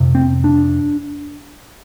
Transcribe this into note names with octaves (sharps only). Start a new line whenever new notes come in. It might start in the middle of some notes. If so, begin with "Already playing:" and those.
Already playing: F2 C3
C4
D4